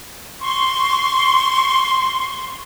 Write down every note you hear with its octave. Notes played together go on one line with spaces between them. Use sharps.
C6 C#6